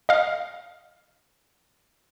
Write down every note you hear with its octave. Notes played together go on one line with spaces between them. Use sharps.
D#5 F5